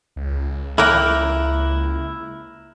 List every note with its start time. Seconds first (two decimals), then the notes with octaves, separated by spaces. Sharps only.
0.16 C#2
0.78 A#3 E4 A#4 G5 A#5 F6 F#6